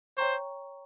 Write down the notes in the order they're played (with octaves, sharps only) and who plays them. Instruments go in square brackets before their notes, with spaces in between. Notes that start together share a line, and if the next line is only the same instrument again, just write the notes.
[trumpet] C5 [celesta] C#5 G5 A#5 C#6